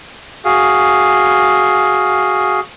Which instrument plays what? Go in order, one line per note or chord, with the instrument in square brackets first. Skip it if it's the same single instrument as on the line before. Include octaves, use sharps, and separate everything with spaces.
[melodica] F#4 G#4 F5